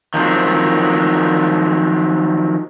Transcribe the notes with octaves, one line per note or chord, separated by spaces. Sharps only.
D#3 F3 F#3 C4